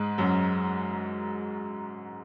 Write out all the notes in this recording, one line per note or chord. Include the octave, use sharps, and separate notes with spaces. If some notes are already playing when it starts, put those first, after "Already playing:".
Already playing: G#2 G#3
F#2 F#3